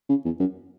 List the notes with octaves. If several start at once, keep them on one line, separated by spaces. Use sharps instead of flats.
C#3
E2
F#2